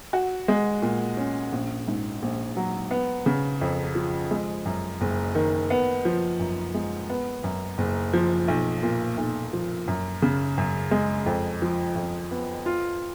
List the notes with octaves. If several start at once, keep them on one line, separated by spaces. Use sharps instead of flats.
F#4
G#3
A#2
C#4
A#1
G#2
A#1
F#3
B3
C#3
F2
F3
G#3
F#2
F#1
D#3
B3
F3
F#2
G#3
B3
F#2
F#1
F3
B1
A#2
B1
F3
F#2
C#3
F#2
G#3
F2
F3
F2
B3
F4